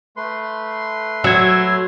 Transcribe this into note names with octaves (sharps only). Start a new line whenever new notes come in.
A3 B4 C6
F#3 E6 G#6